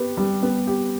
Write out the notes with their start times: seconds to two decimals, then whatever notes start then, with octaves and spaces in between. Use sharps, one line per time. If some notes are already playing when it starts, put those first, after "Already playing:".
Already playing: B3 G4 B4
0.17 G3
0.43 B3
0.67 G4